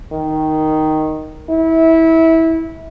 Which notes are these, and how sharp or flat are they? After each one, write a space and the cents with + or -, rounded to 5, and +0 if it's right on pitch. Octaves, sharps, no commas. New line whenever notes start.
D#3 +0
E4 -20